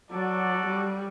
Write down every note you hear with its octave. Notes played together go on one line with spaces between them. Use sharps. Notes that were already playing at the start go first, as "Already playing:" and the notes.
F#3 F#4 A4 D5
G3